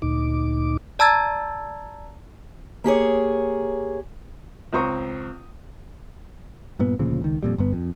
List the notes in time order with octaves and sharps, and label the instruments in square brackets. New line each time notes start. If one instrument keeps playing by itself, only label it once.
[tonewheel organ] D2 A#2 D#4 D6
[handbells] D5 A5 A#5 E6 G#6 A6
[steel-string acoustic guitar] A#3 G4 G#4 C#5
[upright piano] C#2 C4 C5 A#5 C#6 D#6
[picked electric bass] G2 A#2 B3
D2 A#2 C#3 F3
C#2 D#3
F2 A#2 G3
G1 G2 B3
F2